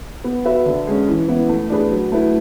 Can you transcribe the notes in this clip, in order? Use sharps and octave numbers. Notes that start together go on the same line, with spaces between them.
B3
F#4 B4 E5
D3
G#3 C#4
E3
B3 E4
A3
D4 G#4 B4
F#3
A3 E4 B4